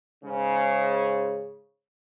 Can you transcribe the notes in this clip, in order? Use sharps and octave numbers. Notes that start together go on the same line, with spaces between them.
G#2 C#3